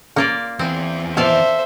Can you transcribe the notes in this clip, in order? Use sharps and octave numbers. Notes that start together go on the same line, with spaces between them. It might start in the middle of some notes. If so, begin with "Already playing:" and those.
C#3 A#3 F4 D5
E2 E3 C4
B2 A4 C5 D5 E5 F5